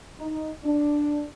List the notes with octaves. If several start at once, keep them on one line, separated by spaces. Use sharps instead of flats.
D#4
D4